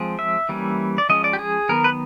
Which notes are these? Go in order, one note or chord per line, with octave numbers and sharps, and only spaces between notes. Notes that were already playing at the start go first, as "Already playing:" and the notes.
Already playing: F3 G#3 C4
E5
E3 G3 A#3 C#4
D5
F3 G#3 C#4 D#5
D5
G4
G#4
D#3 F#3 B3 A#4
B4